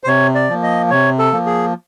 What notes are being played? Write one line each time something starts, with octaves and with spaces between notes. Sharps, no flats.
C5
C3 C#5
D5
F3 A#3
D#5
C3 C#5
A4
F3 A#3
G#4